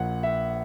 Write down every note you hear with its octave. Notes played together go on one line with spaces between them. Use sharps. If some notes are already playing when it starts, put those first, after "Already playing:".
Already playing: A#1 A#2 F#5
E5